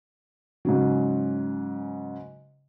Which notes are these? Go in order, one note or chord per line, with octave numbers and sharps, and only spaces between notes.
G#2 C#3 F#3